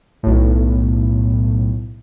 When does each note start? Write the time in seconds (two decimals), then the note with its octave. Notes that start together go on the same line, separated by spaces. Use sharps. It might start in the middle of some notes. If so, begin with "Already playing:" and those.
0.23 B1 A2